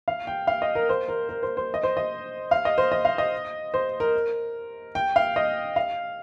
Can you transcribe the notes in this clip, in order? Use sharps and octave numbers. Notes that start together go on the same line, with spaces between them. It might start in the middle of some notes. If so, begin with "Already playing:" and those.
F5
G5
F5
D#5
A#4
C5
A#4
A#4
C5
C5
D#5
C5
D#5
F5
D#5
C5
D#5
F5
D#5
C5
A#4
G5
F5
D#5
F5